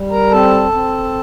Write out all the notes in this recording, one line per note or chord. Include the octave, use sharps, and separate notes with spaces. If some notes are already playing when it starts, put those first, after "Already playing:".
Already playing: G3
A#4 A#5
C4 A4 A5
C4